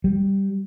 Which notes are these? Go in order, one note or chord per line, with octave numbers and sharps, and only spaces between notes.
G3